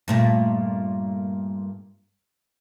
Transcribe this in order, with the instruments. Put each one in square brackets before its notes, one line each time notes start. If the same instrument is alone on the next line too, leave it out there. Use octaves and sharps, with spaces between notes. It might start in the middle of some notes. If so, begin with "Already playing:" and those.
[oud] G2 A#2 A3